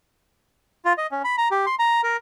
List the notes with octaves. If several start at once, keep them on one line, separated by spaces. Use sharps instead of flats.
F4
D#5
C#4
B5
A#5
G4
C6
A#5
A#4